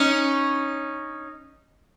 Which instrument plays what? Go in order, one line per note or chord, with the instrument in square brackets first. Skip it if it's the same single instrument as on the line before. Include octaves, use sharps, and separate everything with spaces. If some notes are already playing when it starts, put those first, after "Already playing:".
Already playing: [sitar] C#4 D#4